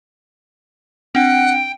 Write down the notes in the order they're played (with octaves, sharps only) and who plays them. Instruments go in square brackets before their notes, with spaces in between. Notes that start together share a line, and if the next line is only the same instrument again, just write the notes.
[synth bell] C4 D4 [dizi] F#5 [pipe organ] G5